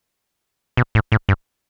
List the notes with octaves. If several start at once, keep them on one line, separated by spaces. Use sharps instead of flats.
B2
A2
A2
G2